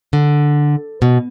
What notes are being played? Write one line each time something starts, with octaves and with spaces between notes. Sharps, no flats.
D3
B2